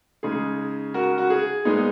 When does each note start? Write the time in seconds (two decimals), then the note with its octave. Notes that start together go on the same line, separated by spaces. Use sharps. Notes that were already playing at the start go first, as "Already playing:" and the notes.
0.23 C#3 G#3 D#4 G#4
0.94 F#4 A#4
1.18 F#4
1.30 G#4
1.65 A#2 G#3 B3 D#4